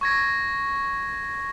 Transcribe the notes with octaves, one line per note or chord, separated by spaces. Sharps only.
C#6 G#6 A#6